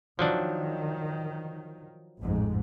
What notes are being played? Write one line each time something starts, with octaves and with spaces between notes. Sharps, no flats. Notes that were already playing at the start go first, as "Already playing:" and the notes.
D#3 F3 F#3 D4
A1 F2 G#2